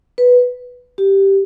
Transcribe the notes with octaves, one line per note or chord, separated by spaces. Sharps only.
B4
G4